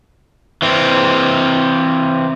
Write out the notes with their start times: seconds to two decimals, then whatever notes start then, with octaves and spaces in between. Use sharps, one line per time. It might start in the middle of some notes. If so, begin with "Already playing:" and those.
0.62 E3 C4